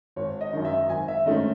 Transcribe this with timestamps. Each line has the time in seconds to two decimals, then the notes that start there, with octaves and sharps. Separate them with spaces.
0.16 G#1 C#5
0.41 D#5
0.53 F#2 D#3
0.65 E5
0.90 G#1 G#5
1.08 E5
1.26 G#2 D#3 A3 C#4 D#5